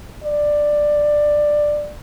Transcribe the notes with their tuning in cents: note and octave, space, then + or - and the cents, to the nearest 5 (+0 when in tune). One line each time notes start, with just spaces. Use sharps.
D5 +10